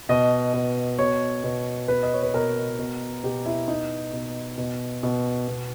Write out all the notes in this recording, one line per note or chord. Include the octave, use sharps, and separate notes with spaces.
B2 D#5
B2
B2 C#5
B2
B2 B4
D#5
C#5
B4
B2 A#4
B2
B2 G4
E4
B2 D#4
B2
B2
B2
B2